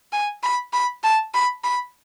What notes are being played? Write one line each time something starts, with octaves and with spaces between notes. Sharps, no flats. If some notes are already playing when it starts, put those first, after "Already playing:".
G#5
B5
B5
A5
B5
B5